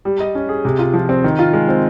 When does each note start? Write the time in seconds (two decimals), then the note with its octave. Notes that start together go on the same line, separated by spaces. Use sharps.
0.05 G3
0.20 D#5
0.35 C#4
0.49 G#4
0.65 C3
0.79 F4
0.93 F3
1.09 C4
1.24 D#3
1.39 F4
1.53 G#3
1.69 C4